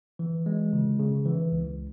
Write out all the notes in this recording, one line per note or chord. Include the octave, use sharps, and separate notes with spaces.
E3
G#3
C#3
C#3
E3
C#2